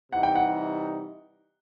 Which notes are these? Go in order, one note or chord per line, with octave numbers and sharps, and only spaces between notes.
C3 E3 G3 D#4 F#5
G5
F#5